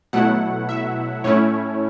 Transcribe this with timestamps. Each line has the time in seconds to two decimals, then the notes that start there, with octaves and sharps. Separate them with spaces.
0.13 B2 F#3 A3 E4 F#5
0.69 E5
1.24 A2 A3 C#4 E4 C#5